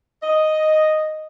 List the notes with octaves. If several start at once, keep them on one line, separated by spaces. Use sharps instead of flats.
D#5